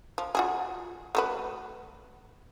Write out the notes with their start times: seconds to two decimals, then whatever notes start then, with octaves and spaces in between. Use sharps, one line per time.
0.18 F3
0.35 F4 F#4 G#4
1.15 A3 F#4 B4